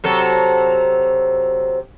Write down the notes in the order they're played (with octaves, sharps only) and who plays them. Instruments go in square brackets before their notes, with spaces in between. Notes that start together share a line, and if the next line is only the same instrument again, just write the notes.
[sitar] C3 F#3 A4